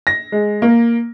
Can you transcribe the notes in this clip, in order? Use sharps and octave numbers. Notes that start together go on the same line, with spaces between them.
A#6
G#3
A#3